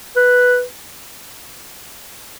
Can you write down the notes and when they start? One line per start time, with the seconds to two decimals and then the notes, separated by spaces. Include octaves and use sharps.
0.16 B4